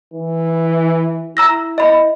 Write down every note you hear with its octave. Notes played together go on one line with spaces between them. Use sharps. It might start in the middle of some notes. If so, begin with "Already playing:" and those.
E3
E4 A#5 E6 A#6
D#5 B5